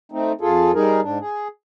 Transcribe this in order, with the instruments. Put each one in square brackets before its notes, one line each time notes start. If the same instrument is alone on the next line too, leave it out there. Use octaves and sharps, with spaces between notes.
[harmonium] A3 C4 D#4
F2 F4 G#4 A4
G3 D#4 G#4 A#4
G#2 D4
G#4